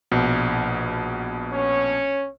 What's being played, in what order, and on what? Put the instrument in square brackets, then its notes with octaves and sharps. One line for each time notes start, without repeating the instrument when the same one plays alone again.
[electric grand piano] A#1 B2
[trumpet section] C#4 C#5